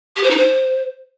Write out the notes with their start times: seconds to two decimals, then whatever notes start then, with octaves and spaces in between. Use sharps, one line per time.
0.16 G4
0.23 C5
0.30 D#4
0.37 C5